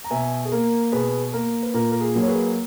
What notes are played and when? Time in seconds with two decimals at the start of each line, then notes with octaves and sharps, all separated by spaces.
0.04 A#5
0.10 B2 E5 G#5
0.45 G#4
0.52 A#3 A#4
0.92 B2 G#4 B4
1.33 A#3 A#4
1.63 B4
1.74 A#2 A#4
1.91 A#4
2.01 G#4
2.15 F#3 A#3
2.22 C#5
2.28 G#4 B4